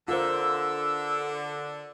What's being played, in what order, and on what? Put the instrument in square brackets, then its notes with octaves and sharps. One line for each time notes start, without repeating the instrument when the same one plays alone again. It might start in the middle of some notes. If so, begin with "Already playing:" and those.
[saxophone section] D3 [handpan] F4 A#4 C5 [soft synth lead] E6